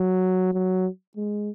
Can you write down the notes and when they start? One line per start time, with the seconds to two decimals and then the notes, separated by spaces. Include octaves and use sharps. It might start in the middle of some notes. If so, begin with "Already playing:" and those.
Already playing: F#3
0.53 F#3
1.17 G#3